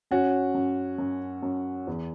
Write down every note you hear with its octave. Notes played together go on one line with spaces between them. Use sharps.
F#2 C#4 F#4
F#2
F#2
F#2
E2